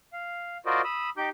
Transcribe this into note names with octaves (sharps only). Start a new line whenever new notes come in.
F5
F4 F#4 A#4 C5 D5 D#5
B5 D#6 E6
D#4 G4 D6 G6